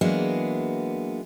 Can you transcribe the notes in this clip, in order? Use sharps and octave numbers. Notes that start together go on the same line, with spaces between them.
E3 F#3 G#3 A#3 B3 D4